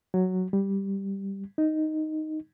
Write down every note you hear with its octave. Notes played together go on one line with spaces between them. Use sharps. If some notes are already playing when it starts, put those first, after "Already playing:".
F#3
G3
D#4